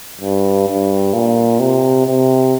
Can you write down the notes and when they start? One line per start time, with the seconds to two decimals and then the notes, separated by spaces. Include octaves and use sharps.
0.21 G2
0.68 G2
1.13 A#2
1.60 C3
2.06 C3